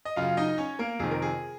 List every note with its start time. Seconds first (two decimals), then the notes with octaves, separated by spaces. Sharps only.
0.05 D#5
0.16 F#2 C#3 F4 F5
0.37 D#4 D#5
0.58 C#4 C#5
0.79 A#3 A#4
0.99 F2 C3 D#3 G#4
1.11 A#4
1.22 G#4